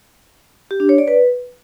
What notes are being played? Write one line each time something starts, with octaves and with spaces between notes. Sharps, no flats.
G4
D4
C#5
D5
B4